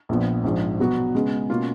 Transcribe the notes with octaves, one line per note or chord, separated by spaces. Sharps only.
A#1 A#2 F3 B3
A#1 G#2 F3
B2 F#3 B3 F#4
C#3 G#3 B3
B2 A#3 C#4 F4